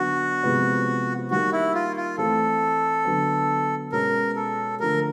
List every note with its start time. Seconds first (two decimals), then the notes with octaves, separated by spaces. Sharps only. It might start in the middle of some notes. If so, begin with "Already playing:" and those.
Already playing: D3 F#3 B3 D4 F#4
0.43 C3 F3 G#3 B3
1.31 D#3 G3 A#3 F#4
1.52 E4
1.74 F4
1.96 F4
2.18 E3 A3 C4 A4
3.05 D3 F#3 B3
3.92 B2 G#3 C#4 A#4
4.36 A4
4.79 D3 F3 A3 A#4